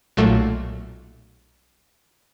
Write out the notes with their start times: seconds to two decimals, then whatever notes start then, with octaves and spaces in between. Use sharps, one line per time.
0.17 B1 A#2 F#3 A3